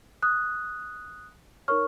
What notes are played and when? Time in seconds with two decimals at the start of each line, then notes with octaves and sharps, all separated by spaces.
0.23 D#6 F#6
1.68 D#4 A#4 C#5 C#6 F6